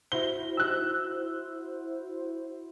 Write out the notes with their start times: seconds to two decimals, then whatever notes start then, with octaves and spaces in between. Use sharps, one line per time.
0.12 E4 F#4 C5 G7
0.57 E6 F#6